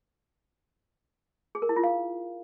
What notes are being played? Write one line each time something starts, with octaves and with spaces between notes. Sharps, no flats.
G#4
A#4
E4
F4
F5